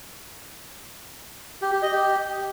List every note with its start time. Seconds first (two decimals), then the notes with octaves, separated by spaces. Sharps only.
1.62 G4
1.72 G4
1.82 D#5
1.93 G4